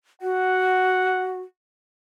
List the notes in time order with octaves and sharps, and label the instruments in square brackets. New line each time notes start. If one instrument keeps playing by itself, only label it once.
[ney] F#4 [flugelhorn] F#5